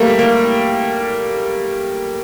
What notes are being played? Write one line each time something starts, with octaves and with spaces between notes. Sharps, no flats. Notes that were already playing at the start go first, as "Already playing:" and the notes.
Already playing: G3 A3 A#3
A#3